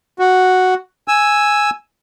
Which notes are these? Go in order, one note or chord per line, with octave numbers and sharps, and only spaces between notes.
F#4
G#5 E6